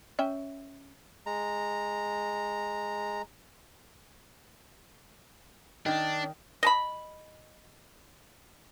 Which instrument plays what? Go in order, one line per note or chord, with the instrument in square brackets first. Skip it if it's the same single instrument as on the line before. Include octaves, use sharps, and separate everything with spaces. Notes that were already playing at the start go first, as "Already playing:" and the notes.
[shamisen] C#4 E5 G5
[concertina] G#3 A#5
[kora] D#3 [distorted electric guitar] D4
[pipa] D#5 A5 B5